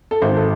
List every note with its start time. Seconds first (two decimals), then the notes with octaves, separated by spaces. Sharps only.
0.11 A4
0.22 G#1 C5
0.37 A4